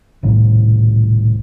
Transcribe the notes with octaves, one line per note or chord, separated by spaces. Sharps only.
D#1 C2 A2